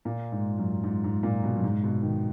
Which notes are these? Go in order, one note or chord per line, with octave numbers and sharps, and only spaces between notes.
A#2
G#2
F#2
G#2
G#2
A#2
B2
F#2
G#2
B2
D#3